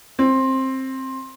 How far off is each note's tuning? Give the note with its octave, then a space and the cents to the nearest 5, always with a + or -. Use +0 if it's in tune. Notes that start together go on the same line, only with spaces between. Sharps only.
C4 +15